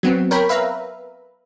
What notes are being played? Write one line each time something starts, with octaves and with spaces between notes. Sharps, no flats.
F#3 B3 C4
A#4 C#5 G5 B5
B4 E5 F5 A#5